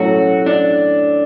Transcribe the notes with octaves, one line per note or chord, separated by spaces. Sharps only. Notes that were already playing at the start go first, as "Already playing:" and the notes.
Already playing: A2 F#3 A3 C#4 F#4
D4